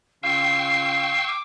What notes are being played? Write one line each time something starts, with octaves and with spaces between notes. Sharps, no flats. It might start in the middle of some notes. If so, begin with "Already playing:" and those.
C#3 F4 F5 G5 C#6 E6 C7
D6